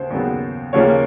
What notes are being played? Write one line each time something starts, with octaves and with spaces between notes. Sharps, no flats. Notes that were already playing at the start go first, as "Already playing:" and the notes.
Already playing: D#2 C#3 C5
D#2 C#3 F#3 B3
D#2 C#3 F3 A#3 C#4 C#5